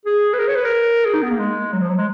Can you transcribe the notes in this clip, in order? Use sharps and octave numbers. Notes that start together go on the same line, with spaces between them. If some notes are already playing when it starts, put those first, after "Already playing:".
G#4
B4
A#4
C#5
B4
A#4
G#4
D#4
B3
A#3
G#3
F#3
F3
F#3
G#3